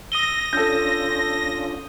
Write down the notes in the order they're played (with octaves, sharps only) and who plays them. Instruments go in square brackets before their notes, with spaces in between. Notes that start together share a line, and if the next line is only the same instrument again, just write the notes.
[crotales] D#6 D#7 G7 [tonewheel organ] E6 [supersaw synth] A#6
[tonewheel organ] C#4 D4 F4 [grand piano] A4 G6